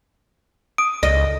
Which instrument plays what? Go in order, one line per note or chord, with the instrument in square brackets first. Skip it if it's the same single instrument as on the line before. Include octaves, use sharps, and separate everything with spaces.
[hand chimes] D#6 [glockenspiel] D7
[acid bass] C#2 [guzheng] D#5